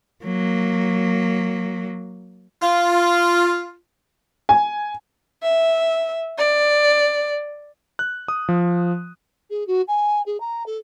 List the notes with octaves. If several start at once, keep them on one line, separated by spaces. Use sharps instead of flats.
F#3 A#3
F4
G#5
E5
D5
F#6
D#6
F3
G#4
F#4
G#5
G#4
A#5
A4